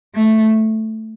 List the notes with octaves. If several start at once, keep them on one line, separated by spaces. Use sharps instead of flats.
A3